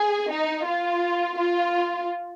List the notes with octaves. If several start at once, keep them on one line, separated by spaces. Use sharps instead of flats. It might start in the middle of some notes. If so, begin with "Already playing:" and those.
Already playing: G#4
D#4
F4
F4